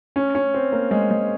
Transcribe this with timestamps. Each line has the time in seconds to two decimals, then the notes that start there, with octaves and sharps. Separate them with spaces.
0.16 C#4
0.35 C#4
0.54 C4
0.72 A#3
0.91 G#3
1.11 G#3